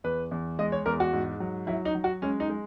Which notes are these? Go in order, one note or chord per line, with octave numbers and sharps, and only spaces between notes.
E2 B4
E2
G#3 D#5
C#5
E2 A#4
F#4
G#2
F#3
F#3 E4
D#4
F#3
F#4
G#3 C#4
D#4
G#3